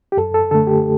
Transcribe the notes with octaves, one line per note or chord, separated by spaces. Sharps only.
G4
F#2 A4
A4
D3 A3 A4
G4